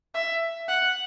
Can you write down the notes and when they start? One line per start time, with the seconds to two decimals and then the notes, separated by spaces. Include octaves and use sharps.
0.14 E5
0.68 F#5